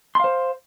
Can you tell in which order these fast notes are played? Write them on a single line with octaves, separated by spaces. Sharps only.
C6 F5 C5